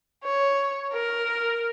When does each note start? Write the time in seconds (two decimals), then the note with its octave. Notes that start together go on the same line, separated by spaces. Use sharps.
0.24 C#5
0.93 A#4